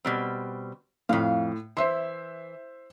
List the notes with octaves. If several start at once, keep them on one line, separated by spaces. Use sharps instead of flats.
B2 G3 C4
F2 A2 F5
E3 C5 E5 C6